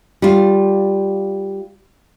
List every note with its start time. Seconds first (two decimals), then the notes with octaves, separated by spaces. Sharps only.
0.22 G3 F4